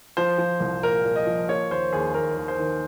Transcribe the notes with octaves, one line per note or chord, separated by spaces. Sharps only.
F3 C5
F3
C2
A#2 A#4
A#2
D#5
F3
A#3 C#5
D#2 C5
D#2 G#4
D#2 A#4
D#2
C5
D#3